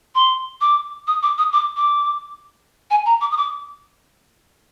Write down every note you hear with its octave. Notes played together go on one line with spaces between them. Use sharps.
C6
D6
D#6
D6
D#6
D6
D6
G#5
A#5
D6
D#6
D6